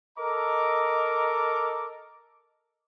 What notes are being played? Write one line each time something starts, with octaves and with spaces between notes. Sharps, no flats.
A4 A#4 D#5 A#5 D6